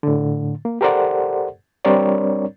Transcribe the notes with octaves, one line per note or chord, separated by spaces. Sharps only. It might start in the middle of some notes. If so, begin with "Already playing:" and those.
A2 D3
A#3
G4 A4 A#4 C5 D5 F#5
G3 C4 D4 A#4 C#5 D5